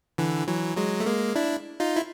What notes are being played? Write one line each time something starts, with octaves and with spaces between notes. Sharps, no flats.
D3 E3
E3 F#3
F#3 G#3
A3
G#3 A#3
D4 E4
D#4 F4
E4